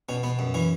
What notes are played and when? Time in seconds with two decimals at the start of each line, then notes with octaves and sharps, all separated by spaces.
0.09 B2 C#4
0.23 B2 B3
0.39 F#2
0.54 E3 C#4